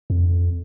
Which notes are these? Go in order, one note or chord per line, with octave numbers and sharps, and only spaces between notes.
F2